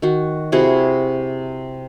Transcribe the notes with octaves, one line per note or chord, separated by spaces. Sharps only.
D#3 F#4
C3 E4 F#4 G#4